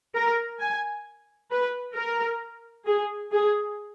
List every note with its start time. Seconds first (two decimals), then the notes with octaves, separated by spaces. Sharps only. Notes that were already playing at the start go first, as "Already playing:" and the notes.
0.15 A#4
0.60 G#5
1.51 B4
1.95 A#4
2.86 G#4
3.32 G#4